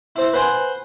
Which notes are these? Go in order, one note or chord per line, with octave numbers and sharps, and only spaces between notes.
C4 E4
B4 C5 F#5 G#5 C6